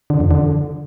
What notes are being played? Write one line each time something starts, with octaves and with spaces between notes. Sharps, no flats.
D3
F2
D3